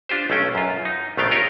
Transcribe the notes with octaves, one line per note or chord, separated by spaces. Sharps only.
D4 F4 G4 C5
B1 A3 C#4 G5
F#2 F4
D#4
A#1 D#3 A3 B3 F5 G5
F4 G4 A#4 C#5 D#5 F5